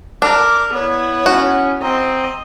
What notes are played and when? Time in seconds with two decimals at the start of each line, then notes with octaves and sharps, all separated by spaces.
0.22 D4 A#4 D6
0.74 B3 E4 C#5
1.26 C#4 F#4
1.82 C4 D#5 A#5